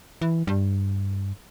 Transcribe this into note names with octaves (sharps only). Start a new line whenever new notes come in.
E3
G2